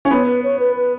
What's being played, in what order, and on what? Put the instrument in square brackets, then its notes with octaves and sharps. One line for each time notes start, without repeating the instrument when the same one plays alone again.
[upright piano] C#4
[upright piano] B3 [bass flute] C#5
[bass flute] B4
C#5
B4
B4